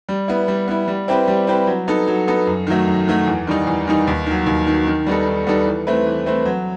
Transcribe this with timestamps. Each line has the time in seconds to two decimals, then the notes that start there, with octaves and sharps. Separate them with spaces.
0.08 G3
0.28 B3 E4
0.48 G3
0.68 B3 E4
0.88 G3
1.08 C4 E4 G4 B4
1.28 G3
1.47 C4 E4 G4 B4
1.67 F#3
1.88 B3 D#4 A4
2.07 F#3
2.27 B3 D#4 A4
2.47 F#2
2.67 D#3 F#3 A3
2.87 F#2
3.08 D#3 F#3 A3
3.27 E2
3.47 D#3 G3 D#4
3.67 E2
3.87 D#3 G3 D#4
4.07 D#2
4.26 D#3 F#3
4.46 D#2
4.67 D#3 F#3
4.87 D#3
5.06 G3 B3 D#4 A4
5.27 D#3
5.47 G3 B3 D#4 A4
5.66 E3
5.87 A3 C4 E4 B4
6.06 E3
6.26 A3 C4 E4 B4
6.45 F#3